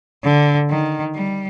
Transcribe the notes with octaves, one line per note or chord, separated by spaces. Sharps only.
D3
D#3
G3